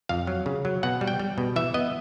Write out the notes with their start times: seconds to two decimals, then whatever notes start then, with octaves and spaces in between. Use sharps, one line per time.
0.09 F2 F5
0.27 F#3
0.46 C#3
0.65 F#3
0.83 B2 F#5
1.01 G3
1.08 G5
1.20 G3
1.38 B2
1.56 E3 E5
1.74 B3 D#5